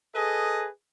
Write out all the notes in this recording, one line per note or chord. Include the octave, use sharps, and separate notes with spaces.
G#4 A4 B4 D#5